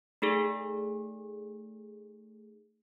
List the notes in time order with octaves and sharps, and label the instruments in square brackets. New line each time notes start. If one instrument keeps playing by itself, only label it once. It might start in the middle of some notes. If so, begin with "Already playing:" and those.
[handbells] A3 D#4 G#4 A4